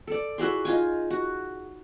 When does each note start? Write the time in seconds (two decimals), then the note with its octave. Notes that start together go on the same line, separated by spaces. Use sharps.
0.07 A4 D5
0.38 E4 F#4 G#4 C6
0.65 D#4 F4 G#5
1.10 F#4